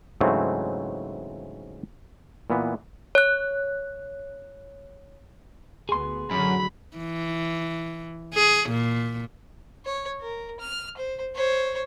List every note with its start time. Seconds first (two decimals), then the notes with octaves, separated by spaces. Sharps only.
0.21 G#2 C#3 E3 F#3 A3 C4
2.50 A#2 E3 B3
3.15 C#5 F#6
5.89 D2 B3 G#4 C6
6.31 A1 F#2 D3 F#3 B5
6.97 E3
8.34 G#4
8.69 A#2
9.85 C#5
10.21 A#4
10.60 F6
10.97 C5
11.35 C5 C#5